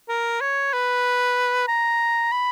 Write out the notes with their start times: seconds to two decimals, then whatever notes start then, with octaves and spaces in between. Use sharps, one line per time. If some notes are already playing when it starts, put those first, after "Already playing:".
0.09 A#4
0.41 C#5
0.73 B4
1.68 A#5
2.32 B5